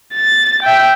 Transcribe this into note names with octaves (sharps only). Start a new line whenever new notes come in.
A6
E5 G5